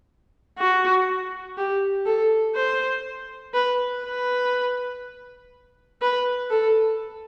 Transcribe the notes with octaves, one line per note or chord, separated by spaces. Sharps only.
F#4
G4
A4
C5
B4
B4
B4
A4